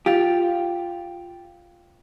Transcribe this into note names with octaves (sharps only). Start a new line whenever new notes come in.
F4 G4